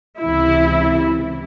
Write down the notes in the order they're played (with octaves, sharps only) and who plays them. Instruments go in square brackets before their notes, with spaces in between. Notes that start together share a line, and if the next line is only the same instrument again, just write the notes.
[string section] C#2 C3 E3 [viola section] E4